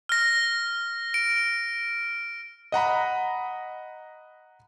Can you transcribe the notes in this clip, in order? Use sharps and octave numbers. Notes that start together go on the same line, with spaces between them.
F6 A#6
D7
D#5 F#5 A#5 B5